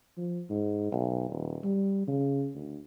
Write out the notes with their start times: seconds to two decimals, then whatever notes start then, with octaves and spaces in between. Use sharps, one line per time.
0.17 F3
0.50 G#2
0.92 B1
1.29 D#1
1.64 G3
2.07 C#3
2.55 D2